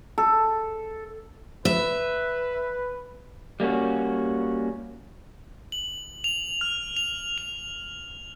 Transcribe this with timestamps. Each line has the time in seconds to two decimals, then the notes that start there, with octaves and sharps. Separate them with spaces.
0.18 A4
1.65 B4 E5
3.60 G3 A#3 C#4 F#4
5.72 F#7
6.24 F7
6.61 F6
6.97 F7
7.38 F7